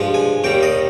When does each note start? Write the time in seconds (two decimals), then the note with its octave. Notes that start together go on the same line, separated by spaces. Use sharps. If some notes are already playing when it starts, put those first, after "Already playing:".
Already playing: G2 F3 G#3
0.14 G#5
0.44 D#2 D#3 G3 G5
0.63 D#5